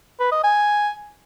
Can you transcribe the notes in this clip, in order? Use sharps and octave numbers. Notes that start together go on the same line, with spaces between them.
B4
D#5
G#5